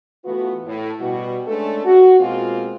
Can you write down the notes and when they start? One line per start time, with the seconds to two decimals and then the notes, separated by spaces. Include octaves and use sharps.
0.25 E3 A3 B3 F4 F#4 B4
0.66 A2
1.00 B2 G3 F#4
1.47 G#3 A3 C#4 D4 A4
1.85 F#4
2.19 B2 G#3 A#3 C4 F4